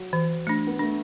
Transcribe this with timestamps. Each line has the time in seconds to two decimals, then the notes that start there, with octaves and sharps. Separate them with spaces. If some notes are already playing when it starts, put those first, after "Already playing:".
Already playing: F#3
0.13 E3
0.47 A3 D4
0.67 B3
0.79 A3 D4